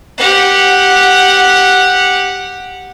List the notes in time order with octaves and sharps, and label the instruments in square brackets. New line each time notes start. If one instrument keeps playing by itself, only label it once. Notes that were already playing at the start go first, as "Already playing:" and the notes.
[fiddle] G4 F#5